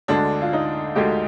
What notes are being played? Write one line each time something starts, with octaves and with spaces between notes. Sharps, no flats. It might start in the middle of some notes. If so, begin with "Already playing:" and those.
D2 D3 G#3 D4
F4
D#4
D2 D3 G#3 G4